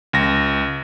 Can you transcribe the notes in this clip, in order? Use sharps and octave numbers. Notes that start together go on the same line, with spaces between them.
C#2 A#6